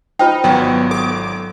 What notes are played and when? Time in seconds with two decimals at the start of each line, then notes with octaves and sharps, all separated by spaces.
0.19 D#4 F4 C5 G5
0.44 G#1 F#3 B3 D5
0.91 A4 D6